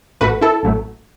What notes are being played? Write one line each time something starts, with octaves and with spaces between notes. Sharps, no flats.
A1 A2 A3 F#4 B4
E4 A4
A1 A2 F#3 A3